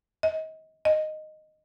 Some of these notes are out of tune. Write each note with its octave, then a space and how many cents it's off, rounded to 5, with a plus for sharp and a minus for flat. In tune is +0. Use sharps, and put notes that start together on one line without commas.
D#5 +30
D#5 -5